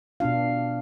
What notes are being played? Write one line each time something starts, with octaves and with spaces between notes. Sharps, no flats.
B2 B3 D4 F4 F5